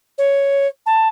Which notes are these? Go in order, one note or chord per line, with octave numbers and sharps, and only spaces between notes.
C#5
A5